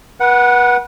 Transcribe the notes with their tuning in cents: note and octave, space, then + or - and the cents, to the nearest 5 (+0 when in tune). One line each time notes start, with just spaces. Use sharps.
B4 -30 F#5 +0